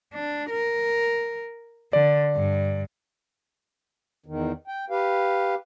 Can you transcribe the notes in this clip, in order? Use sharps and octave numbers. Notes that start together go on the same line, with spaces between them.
D4
A#4
D3 D5
G2
E2 D#3
G5
G4 B4 F5